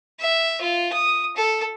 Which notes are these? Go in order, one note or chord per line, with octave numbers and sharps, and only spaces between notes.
E5
F4
D#6
A4